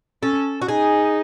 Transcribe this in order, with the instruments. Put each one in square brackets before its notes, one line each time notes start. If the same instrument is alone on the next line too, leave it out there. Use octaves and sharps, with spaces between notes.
[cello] C#4 [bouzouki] A4
[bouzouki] F#4
[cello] D#4 [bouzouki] G#4